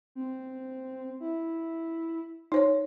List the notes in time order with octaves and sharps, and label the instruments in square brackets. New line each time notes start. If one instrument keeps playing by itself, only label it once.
[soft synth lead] C4
E4
[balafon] D#4 C5 C#5